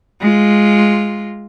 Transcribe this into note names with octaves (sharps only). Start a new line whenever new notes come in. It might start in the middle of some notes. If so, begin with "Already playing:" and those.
G#3 F4